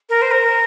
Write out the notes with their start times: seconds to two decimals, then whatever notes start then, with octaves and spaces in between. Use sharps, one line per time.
0.10 A#4
0.22 C5
0.31 A#4